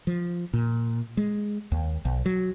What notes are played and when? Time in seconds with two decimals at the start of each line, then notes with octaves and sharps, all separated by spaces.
0.07 F3
0.53 A#2
1.17 G#3
1.72 D#2
2.05 B1
2.26 F#3